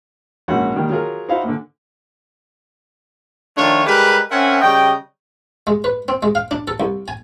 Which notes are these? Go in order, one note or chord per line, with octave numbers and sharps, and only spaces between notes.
A#1 G#2 C#4 F#4 F#5
D#3 G3 A#3
F#3 F4 G#4 A#4
D#4 E4 F#4 C5 F5 F#5
A#2 D3
D#3 F3 A3 D4 F4 C#5
G3 G#3 G4 G#4 A#4 B4
C4 C#4 A#4 E5 F#5 G#5
C#3 G3 D#5 G5
G#3
B4
C4
G#3
F5
D4
A4
C2
G#5